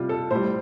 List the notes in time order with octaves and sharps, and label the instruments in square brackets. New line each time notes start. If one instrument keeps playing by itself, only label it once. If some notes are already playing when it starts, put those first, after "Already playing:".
Already playing: [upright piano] C3 G3 F4
A4
A2 G3 C5